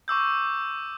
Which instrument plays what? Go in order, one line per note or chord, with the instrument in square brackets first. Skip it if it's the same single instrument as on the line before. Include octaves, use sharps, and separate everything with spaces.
[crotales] C#6 D6 E6 G6